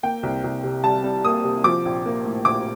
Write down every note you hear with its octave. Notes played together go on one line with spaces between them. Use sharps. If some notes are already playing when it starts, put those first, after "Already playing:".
A#3 G5
C2
C2
C3
G3 A5
G3
A#3 D#6
C3
F3 D6
A#1
A#3
A2
A#1 D6